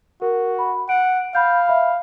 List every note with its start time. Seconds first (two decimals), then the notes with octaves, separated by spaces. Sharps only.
0.22 F#4 A#4
0.59 B5
0.89 F#5 D7
1.35 F5 B5 G6
1.68 E5 B5